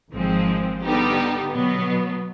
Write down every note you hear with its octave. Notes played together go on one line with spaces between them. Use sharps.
G#1 G#2 F3 G#3 C4
D3 G3 B3 D#4 G4
B2 F#3 B3